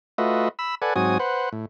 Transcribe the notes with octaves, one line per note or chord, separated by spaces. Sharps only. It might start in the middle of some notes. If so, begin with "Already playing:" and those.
A3 F4 F#4 B4 D#5 E5
B5 E6
A4 B4 D5 F#5 G#5
G#2 F#3 C4 F#4 G#5 D#6
B4 C5 F#5
A2